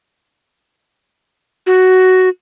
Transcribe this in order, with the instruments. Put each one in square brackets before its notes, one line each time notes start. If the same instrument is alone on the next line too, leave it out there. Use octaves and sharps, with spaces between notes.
[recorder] F#4